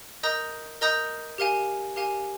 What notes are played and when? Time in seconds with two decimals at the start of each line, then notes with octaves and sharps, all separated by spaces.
0.23 A#4 D#5 A#5 D#6 G6
0.81 A#4 D#5 A#5 D#6 G6
1.38 G4 A#4 F5 G#5
1.96 G4 A#4 F5 G#5